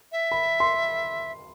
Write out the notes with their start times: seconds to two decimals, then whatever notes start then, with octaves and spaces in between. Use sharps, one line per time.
0.12 E5
0.32 B5
0.60 C6